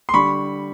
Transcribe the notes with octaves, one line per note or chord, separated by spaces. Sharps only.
C6
D3 G3 B5 C#6